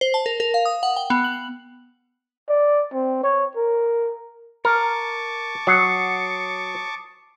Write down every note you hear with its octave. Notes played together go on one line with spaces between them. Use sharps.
C5
A5
A#4
A#4
F5
D#6
F#5
G5
B3
F#7
D5
C4
C#5
A#4
A#4 A5 C#6 D6
F#3 D#6 C7 C#7